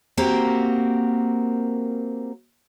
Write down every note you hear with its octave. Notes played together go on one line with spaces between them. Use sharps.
A#3 C4 F#4 G4 A#4